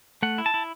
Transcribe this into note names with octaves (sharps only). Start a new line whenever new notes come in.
A3 F#5
E4
A5
E4